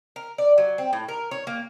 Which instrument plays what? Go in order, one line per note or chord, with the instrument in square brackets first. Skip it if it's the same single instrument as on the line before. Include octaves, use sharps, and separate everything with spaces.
[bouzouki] A#4
D5
F#3
C4
A2
A#4
C#5
A#3